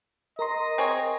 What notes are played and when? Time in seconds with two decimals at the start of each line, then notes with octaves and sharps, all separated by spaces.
0.39 A#4 D#5 A#5 C6
0.78 C4 G#4 C#5